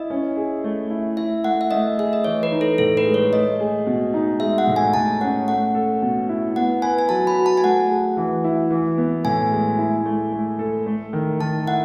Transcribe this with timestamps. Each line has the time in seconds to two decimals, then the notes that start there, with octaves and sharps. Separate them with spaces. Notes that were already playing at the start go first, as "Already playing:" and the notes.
Already playing: E4 D#5
0.10 C#4
0.37 G#4
0.64 A3
0.90 E4
1.17 E4 E5
1.44 A3 F#5
1.61 E5
1.71 A3 D#5
1.98 G#4 E5
2.13 D#5
2.24 E3 C#5
2.43 B4
2.52 D#4
2.61 A4
2.78 A2 A4
2.97 B4
3.05 G#3
3.14 C#5
3.33 A3 D#5
3.60 G#4
3.86 B2
4.14 D#4
4.40 G#3 E5
4.58 F#5
4.67 A2
4.76 G#5
4.94 A2 A5
5.21 C#4 F#5
5.48 A3 F#5
5.75 A4
6.02 B2
6.29 E4
6.56 B3 F#5
6.82 B4 G#5
6.99 G#5
7.09 F#3 A5
7.27 B5
7.36 F#4
7.46 A5
7.57 G#5
7.63 A3 F#5
7.90 G#4
8.17 E3
8.44 E4
8.71 E3
8.98 B3
9.25 A2 G#5
9.51 G#3
9.78 E4
10.05 A3
10.32 A3
10.59 A4
10.86 A3
11.13 D#3
11.40 D#3 A5
11.67 E4 F#5